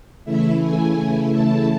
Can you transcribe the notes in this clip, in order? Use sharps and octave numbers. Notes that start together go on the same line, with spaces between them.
C#3 E3 A3 E4 E5
G#5
A5